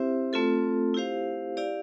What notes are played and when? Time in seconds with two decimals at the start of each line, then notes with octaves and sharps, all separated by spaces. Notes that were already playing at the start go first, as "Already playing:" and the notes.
Already playing: C4 E4 G4 C5 E5
0.33 A3 C4 F4 A4
0.94 E4 G4 C5 F5
1.57 E4 G4 D5 F5